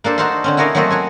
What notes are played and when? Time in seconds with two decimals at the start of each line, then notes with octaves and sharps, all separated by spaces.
0.04 A#3 D4 A4 C5
0.18 D#4 F#4 A4 C5 F5 C6
0.44 D3 C4 C#4
0.57 E4 F#4 A#4 C#5 D#5 F5
0.75 F#3 A3 A#3 C4 A4 D#5
0.90 F#4 C#5 G#5